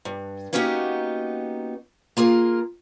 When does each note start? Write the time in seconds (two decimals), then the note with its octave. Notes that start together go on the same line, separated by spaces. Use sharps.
0.05 G2
0.53 A#3 B3 C#4 D#4 F#4 G4
2.17 A#3 F4 G#4 A#4